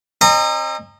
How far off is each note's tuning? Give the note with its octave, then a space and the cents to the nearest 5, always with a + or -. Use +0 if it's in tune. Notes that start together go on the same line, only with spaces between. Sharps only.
C4 +45 D#5 -25 A#5 -25